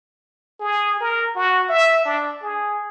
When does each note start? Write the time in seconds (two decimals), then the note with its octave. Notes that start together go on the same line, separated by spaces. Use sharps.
0.60 G#4
1.00 A#4
1.36 F#4
1.69 E5
2.05 D4
2.43 G#4